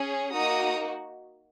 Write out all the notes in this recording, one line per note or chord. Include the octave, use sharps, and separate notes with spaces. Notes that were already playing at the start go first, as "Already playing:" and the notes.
Already playing: C#4 G#4
A#3 D#4 F#4 A#5 D#6